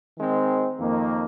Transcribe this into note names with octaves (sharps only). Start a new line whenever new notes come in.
D#3 G#3 C4
F2 D#3 A#3